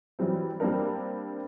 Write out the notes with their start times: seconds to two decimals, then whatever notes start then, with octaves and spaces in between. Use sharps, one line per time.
0.19 E3 F#3 G3 C4
0.60 G3 A#3 C4 D4 A#4